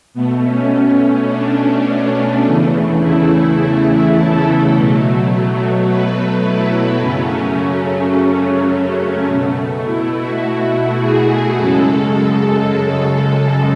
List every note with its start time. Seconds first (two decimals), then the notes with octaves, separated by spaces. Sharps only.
0.14 B2 A3 B3
0.42 C#4
1.28 D4
2.43 E2 C#3 E3 A3
2.99 E4
4.13 A4
4.72 B2 F#3 A3
5.86 B4
6.43 E4
7.00 F#2 C#3 F#3 A3 C#4
8.72 C#4
9.28 B2 A3
9.85 E4
10.14 F#4
10.43 F#4
11.00 G#4
11.57 F#2 C#3 G#3 A4